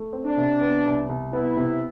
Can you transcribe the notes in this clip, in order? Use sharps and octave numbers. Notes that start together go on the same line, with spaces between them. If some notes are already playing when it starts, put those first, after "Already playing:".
Already playing: A3
C4
D4
C3
B3
C2
C2
B3 E4
C3